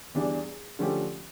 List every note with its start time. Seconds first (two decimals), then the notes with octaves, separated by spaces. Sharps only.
0.14 E2 E3 G3 D4
0.79 D3 F3 A3 C#4 G4